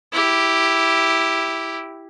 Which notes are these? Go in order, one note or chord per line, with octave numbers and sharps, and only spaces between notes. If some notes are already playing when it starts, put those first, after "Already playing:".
E4 G4